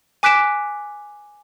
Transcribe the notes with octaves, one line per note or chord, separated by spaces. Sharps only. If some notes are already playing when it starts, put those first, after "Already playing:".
G#5 D6 F#6 B6 D7 E7